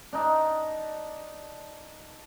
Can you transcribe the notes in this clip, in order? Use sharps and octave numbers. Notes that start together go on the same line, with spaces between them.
D4 D#4